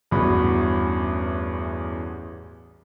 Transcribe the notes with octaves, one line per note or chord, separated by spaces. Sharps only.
A1 E2 G2 F#4 B5